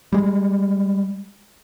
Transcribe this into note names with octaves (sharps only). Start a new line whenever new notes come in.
G3 G#3